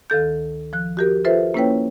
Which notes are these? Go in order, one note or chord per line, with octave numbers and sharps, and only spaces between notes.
D2 D#3 A4 G6
F3 F#6
F#4 G4 A#4
F4 A4 B4 C5 E5
A#3 C#4 E4 B4 C#5 G5